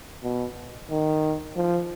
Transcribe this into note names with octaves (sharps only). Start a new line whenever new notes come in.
B2
D#3
F3